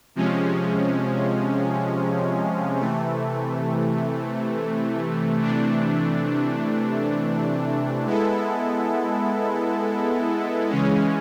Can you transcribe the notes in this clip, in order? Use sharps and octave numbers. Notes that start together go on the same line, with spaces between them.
C3 F3 G#3 C#4
C3 E3 A3
C3 E3 A3 D4
G#3 B3 E4 A4
C#3 E3 G#3 C#4